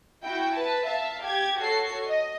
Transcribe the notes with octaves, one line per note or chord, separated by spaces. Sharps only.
E4 F#4 G5
B4 A5
E5 F5 A5
G4 G#6
F#4 A4 C#5 C7
D#5